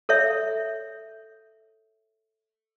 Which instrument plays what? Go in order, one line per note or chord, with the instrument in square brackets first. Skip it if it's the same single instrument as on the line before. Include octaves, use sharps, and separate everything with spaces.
[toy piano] A4 C#5 E5